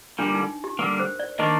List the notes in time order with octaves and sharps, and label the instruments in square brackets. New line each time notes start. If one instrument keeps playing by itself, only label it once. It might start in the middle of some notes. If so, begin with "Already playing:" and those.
[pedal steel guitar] D3 G3 A#3 [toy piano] D4
[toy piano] D#4
G4
[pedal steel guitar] D3 G3 A#3 [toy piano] A#4
[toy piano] C5
D5
[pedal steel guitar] D#3 A#3 D4 [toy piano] D#5